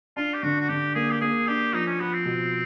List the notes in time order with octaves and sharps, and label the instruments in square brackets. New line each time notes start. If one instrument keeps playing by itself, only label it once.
[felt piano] D4 [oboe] F4
[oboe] G4
[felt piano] D3 [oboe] F#4
[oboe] F#4
[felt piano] D3 [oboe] G4
[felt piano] A#3 [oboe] G#4
[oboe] G4
[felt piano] A#3 [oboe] G#4
[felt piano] D4 [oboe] G4
[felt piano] F3 [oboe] D#4
[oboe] C#4
[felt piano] F3 [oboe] B3
[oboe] C4
[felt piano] B2